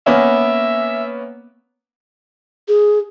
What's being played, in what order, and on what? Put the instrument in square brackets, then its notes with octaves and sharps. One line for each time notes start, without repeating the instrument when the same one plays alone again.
[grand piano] A#3 B3 C#4 [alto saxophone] E5
[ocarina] G#4